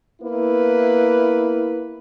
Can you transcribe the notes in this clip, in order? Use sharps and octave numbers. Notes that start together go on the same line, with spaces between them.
A#3 B3 E4 B4